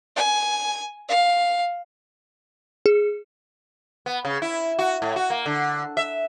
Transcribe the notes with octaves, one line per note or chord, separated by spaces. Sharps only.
G#5
F5
G#4
B3
C#3
E4
F#4
A2
F#4
A#3
D3
E5